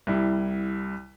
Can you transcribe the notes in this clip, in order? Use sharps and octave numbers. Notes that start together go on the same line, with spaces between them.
C2 G3 E4